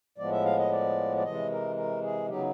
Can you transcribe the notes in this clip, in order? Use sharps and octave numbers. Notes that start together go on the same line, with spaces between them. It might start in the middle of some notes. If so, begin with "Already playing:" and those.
A2 F3 G#3 B3 D5
E5
F5
D#5
D5
D5
C3 E3 G#3 D#5
A#4
A#4
G#4
C#3 F#3 B3 D#4 G4